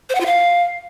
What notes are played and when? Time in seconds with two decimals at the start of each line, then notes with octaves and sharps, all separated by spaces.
0.09 C5
0.15 F#5
0.20 F4
0.26 F5